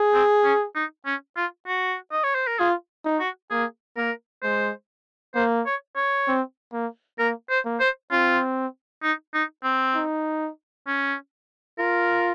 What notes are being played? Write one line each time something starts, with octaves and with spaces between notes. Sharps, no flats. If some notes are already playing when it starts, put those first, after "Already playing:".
Already playing: G#4
C4
C#4
D#4
C#4
F4
F#4
D#5
C#5
C5
A#4
F4 G#4
D#4
F#4
A#3 G#4
A#3 A#4
G#3 C5
A#3 C5
C#5
C#5
C4
A#3
A#3 A#4
C5
A#3
C5
C4 F4
D#4
D#4
C4
D#4
C#4
F4 A#4